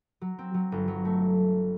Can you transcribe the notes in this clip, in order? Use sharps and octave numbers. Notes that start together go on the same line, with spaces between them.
F#3
C4
F#3
G1
F#3
A3